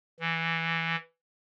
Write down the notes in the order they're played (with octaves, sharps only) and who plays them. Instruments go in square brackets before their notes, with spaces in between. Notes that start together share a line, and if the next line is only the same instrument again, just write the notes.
[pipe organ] E3